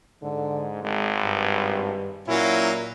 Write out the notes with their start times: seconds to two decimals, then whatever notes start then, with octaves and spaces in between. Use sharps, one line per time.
0.23 G#2 D3
0.83 G#1 G#3
1.22 G2
2.28 A#2 F#3 A#3 C#4 E4